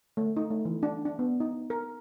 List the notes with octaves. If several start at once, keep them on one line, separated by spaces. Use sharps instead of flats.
A3
D#4
A3
E3
D4
D4
B3
D#4
A#4